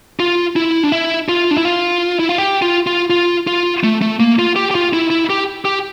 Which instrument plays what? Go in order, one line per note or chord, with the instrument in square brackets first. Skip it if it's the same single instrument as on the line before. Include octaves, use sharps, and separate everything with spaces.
[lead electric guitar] F4
E4
D4
E4
F4
D4
E4
F4
E4
F4
G4
F4
F4
F4
F4
A3
A3
A#3
F4
G4
G4
F4
E4
E4
G4
G4